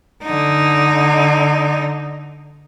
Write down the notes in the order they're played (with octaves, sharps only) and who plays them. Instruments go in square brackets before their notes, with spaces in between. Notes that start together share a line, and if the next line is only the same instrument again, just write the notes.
[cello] D3 D#4